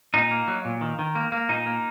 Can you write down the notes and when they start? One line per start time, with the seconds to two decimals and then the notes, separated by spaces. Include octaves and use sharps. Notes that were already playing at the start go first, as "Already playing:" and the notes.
0.14 A#2 D#4
0.31 A#3
0.48 F#3
0.65 A#2
0.81 D#3
0.99 D#3
1.15 A#3
1.32 A#3
1.49 A#2 D#4
1.66 A#3